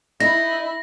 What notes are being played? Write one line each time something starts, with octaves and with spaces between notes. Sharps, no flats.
D#4 E4 B5 A#6